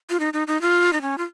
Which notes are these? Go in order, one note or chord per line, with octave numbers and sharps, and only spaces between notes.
F4
D#4
D#4
D#4
F4
D#4
C#4
F4